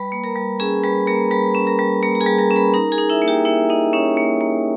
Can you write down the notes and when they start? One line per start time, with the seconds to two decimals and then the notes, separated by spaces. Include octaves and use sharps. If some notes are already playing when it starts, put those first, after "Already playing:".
Already playing: G3 B4 B5
0.12 A#3
0.24 A#4 A#5
0.36 G3
0.60 C#4 G#4 G#5
0.83 G3 B4 B5
1.07 A#3 A#4 A#5
1.31 G3 B4 B5
1.55 C#4
1.67 A#4 A#5
1.79 G3
2.02 A#3 A#4 A#5
2.15 A#5
2.21 G#4 G#5
2.26 G3
2.38 A#4 A#5
2.51 C#4
2.56 B4 B5
2.74 D#4 A#4 A#5
2.92 G#4 G#5
2.98 D#4
3.10 E4 E5
3.22 A#3
3.28 G4 G5
3.45 A#3 E4 E5
3.70 D#4 D#5
3.93 C#4 D#4 C#5
4.17 A#3
4.41 A#3